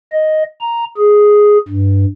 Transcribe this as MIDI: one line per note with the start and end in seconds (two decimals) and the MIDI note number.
0.12 0.43 75
0.61 0.84 82
0.97 1.58 68
1.68 2.05 43